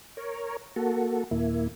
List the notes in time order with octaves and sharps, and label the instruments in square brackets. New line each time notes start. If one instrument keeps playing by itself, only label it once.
[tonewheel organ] A#4 C#5
A#3 F#4 A4
D#2 A#2 A#3 E4